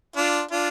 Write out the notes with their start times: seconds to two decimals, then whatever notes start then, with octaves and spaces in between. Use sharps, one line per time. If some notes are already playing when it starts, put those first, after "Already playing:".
0.16 D4 F4
0.52 D4 F4